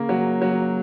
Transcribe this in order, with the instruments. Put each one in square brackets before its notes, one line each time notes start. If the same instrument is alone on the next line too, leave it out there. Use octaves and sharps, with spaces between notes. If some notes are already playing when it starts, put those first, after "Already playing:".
Already playing: [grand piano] C#3 A#3
F#3
F#3